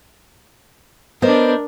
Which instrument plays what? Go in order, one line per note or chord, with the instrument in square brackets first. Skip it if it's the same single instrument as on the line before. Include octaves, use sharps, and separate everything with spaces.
[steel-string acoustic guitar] B3 C5 D#5 [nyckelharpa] D4 A#4